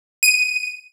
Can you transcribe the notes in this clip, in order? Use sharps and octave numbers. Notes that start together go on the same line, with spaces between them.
D#7